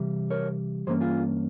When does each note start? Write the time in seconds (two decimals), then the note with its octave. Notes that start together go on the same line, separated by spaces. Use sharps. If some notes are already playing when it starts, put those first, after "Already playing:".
Already playing: C3 E3 G3
0.30 A#4 C#5
0.87 G2 E3 A#3 C#4 G#4 C5
1.01 F4 G#4